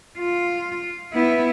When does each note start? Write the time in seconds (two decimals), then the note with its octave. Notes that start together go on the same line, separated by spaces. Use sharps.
0.19 F4
1.13 B3 E4